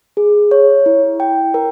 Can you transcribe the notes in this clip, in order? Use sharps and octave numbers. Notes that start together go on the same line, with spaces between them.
G#4
C#5
E4
G5
A#4